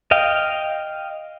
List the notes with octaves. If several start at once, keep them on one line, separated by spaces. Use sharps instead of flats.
D#5 F5 G5